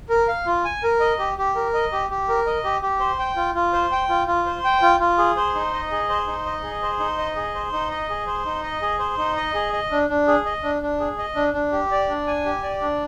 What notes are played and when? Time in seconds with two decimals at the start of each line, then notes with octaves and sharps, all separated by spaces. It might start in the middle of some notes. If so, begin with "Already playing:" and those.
0.09 A#4
0.28 F5
0.46 F4
0.65 G#5
0.83 A#4
1.00 D#5
1.19 G4
1.38 G4
1.56 A#4
1.74 D#5
1.92 G4
2.10 G4
2.29 A#4
2.47 D#5
2.64 G4
2.82 G4
3.00 C5
3.19 G5
3.36 F4
3.55 F4
3.73 C5
3.92 G5
4.09 F4
4.27 F4
4.46 C5
4.64 G5
4.82 F4
5.00 F4
5.18 G#4
5.37 C5
5.55 D#4
5.73 D#5
5.91 G#4
6.09 C5
6.27 D#4
6.46 D#5
6.63 G#4
6.82 C5
7.00 D#4
7.18 D#5
7.36 G#4
7.55 C5
7.73 D#4
7.91 D#5
8.10 G#4
8.27 C5
8.45 D#4
8.63 D#5
8.82 G#4
8.99 C5
9.18 D#4
9.36 D#5
9.54 G#4
9.73 D#5
9.91 D4
10.09 D4
10.28 G#4
10.45 D#5
10.63 D4
10.82 D4
11.00 G#4
11.18 D#5
11.36 D4
11.54 D4
11.72 G4
11.91 D5
12.09 D4
12.27 G#5
12.45 G4
12.63 D5
12.81 D4